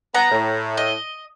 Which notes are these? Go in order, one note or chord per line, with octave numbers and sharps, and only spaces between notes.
B3 A#5
A2
D#5